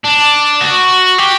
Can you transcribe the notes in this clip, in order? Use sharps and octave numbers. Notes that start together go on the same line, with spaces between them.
D4
F#4
G4